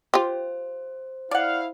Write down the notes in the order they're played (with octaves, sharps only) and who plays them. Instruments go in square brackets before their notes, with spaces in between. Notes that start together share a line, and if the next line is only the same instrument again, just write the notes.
[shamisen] F4 G4 [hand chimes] C5
[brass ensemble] E4 F5 [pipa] D5 F#5